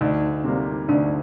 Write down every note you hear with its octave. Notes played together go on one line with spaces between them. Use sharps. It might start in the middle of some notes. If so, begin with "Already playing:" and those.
D2 D#4
C3 G3 A#3
D2 D4